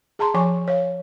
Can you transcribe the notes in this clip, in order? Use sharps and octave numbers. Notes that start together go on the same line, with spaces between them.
G#4 A5 A#5 C6
F3 C#5 G#5 C#6
C#5 F5